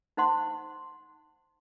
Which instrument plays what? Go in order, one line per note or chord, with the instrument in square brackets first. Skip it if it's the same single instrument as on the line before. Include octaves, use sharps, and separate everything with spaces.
[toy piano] D#4 C5 F#5 C6